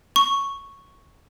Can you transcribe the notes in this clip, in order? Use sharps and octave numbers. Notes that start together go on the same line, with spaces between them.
C#6